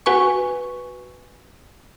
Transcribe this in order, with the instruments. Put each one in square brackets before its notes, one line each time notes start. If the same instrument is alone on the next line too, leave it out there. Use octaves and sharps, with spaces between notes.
[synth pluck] F#4 B4 G#5 C#6